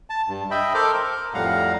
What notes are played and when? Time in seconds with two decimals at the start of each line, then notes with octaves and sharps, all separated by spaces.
0.10 A5
0.28 G2
0.51 D#5 E5 G5 B5
0.74 A4 A#4 C5 D6 F6 G6
0.93 A#4
1.34 F2 A2 G3 F5 F#5 A#5